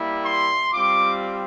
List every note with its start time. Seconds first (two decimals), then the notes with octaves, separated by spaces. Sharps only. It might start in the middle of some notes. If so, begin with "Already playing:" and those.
Already playing: G3 A#3 E4
0.25 C6
0.73 G3 C4 F4 D6